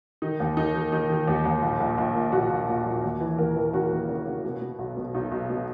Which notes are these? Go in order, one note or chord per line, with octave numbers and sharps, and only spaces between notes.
D#3 D#4
D#2
D#3 D#4
D#3
D#3 D#4
D#3
D#2
D#2
A#1
A#1
A#1
A#2
A#1 F#4
A#1
A#2
A#1
D#2
E3
D#2 A#4
E3
C#3 F#4
D#2
C#3
C#3
B2
B2
B1
B2
B1 D#4
B1
B2